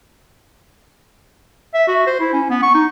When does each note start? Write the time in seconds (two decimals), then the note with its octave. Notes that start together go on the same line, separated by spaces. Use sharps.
1.74 E5
1.88 F#4
2.07 C5
2.20 E4
2.33 C#4
2.50 B3
2.63 C#6
2.75 D#4